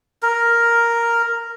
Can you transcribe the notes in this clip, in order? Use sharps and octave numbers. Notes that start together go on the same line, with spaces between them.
A#4